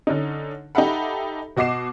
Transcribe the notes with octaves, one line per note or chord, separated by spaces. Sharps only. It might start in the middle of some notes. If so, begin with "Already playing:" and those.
D3 C#4 D#4
D#4 G4 A4 E5 F#5 B5
B2 F#4 D#5 D6 C7 E7